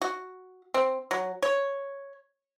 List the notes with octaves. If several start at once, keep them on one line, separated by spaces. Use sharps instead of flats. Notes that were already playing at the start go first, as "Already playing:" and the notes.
F#4
C4
F#3
C#5